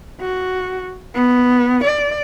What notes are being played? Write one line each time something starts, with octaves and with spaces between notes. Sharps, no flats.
F#4
B3
D5